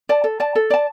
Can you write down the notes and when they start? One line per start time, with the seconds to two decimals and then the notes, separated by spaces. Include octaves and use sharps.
0.09 D5 A5
0.24 A4
0.40 D5 A5
0.55 A4
0.70 D5 A5